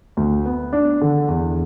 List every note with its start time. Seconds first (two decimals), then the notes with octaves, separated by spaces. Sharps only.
0.17 D2
0.45 B3
0.73 D4
1.01 D3
1.28 E2